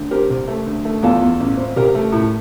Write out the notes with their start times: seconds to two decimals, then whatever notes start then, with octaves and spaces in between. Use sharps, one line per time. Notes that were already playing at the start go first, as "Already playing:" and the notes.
Already playing: D2
0.11 C4 G4 A#4
0.30 C2
0.48 A3
0.66 D2
0.85 A3
1.03 E2 F4 A4
1.21 E2
1.40 A1
1.57 C4
1.76 C2 G4 A#4
1.95 A3
2.12 A2